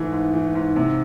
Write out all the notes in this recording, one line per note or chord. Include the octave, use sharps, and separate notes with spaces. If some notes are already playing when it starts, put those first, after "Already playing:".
Already playing: G#2 E3 A3
G#2
E3
G#2
C3